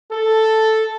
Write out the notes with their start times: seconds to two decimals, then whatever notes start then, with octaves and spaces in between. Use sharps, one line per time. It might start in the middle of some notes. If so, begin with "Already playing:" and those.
0.11 A4